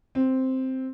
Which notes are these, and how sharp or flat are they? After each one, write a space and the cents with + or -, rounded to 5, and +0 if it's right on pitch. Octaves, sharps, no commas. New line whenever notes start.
C4 +0 C5 +0